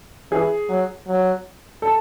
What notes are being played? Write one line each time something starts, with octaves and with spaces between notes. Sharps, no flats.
E3 G#4
F#3
F#3
A4